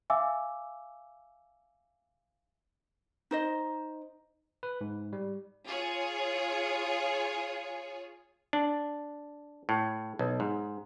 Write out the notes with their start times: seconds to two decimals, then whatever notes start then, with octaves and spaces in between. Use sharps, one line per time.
0.10 E5 F5 G#5 D6 E6
3.31 D#4 C5 D#5
4.63 B4
4.81 G#2
5.13 G3
5.66 F4 G#4 C#5
8.53 D4
9.69 A2
10.19 B1
10.40 G#2